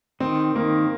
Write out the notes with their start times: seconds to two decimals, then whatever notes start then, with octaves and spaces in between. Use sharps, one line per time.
0.20 D#3 C4
0.55 D#3 A#3